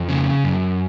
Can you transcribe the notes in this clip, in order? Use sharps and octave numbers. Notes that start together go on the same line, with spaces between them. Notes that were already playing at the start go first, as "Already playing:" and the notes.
Already playing: F2
C#3
F#2